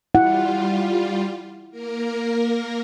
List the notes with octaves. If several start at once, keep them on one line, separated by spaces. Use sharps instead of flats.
G3 E4 F4 F#5
A#3 A#4